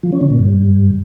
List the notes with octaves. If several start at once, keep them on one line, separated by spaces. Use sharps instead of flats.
F3
C#4
D3
A#2
G2